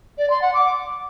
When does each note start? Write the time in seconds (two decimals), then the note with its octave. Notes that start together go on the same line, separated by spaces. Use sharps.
0.18 D5
0.30 C6
0.42 F#5
0.54 D6